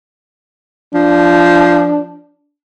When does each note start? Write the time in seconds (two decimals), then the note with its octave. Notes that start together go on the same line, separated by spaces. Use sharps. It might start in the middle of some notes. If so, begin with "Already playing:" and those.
0.94 F3 D4